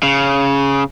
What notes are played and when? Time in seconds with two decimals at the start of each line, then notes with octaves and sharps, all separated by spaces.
0.03 C#3